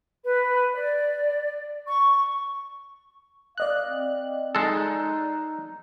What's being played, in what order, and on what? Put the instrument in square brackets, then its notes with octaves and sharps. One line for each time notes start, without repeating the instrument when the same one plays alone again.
[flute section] B4
D5
C#6
[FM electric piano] D5 D#5 F#6 [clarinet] F5
[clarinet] C4
[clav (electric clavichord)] G#3 A4 [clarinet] D#4